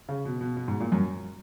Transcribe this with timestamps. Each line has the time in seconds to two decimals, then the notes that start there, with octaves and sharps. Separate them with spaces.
0.09 C#3
0.25 B2
0.41 B2
0.57 B2
0.68 G#2
0.80 A#2
0.92 F#2